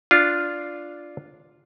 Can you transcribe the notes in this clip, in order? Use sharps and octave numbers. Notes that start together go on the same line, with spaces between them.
D4 F4